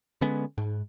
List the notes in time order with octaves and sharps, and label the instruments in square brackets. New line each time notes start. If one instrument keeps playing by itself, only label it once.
[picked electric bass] D3 G#3 B3 C#4
G#2